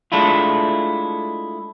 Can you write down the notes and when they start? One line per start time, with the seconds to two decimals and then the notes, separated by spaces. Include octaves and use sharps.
0.12 G#3 A3 D4 E4 F4